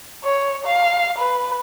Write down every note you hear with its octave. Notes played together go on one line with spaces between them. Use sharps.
C#5
F5
B4